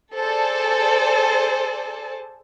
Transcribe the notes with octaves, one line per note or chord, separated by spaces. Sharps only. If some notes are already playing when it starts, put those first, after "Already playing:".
G#4 A4 C5 D5 A5